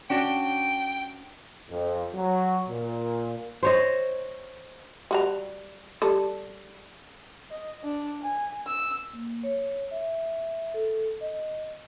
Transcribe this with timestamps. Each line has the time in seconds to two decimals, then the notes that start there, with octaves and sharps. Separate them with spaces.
0.10 C#4 D4 F#4 G5
1.70 F2
2.15 F#3
2.70 A#2
3.63 C5 C#5 D#5
5.11 G3 F#4 A#5
6.02 G3 A4
7.50 D#5
7.84 D4
8.22 G#5
8.67 E6
9.13 A#3
9.43 C#5
9.91 E5
10.74 A4
11.21 D#5